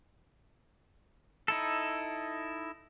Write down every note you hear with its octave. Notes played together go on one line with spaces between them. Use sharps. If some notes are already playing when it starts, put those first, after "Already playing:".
D#4 E4 A4